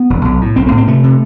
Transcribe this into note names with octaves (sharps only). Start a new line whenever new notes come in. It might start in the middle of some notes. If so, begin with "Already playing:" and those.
Already playing: B3
E1
B1
A2
B1 C4
C4
A2
C4
C3 A3
C3